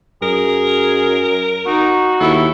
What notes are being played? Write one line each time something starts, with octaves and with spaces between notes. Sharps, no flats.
F#2 G#4 A#4
D#4 F#4
D#2 E4 A4